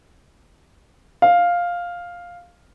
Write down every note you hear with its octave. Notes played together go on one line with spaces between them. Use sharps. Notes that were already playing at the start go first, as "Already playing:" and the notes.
F5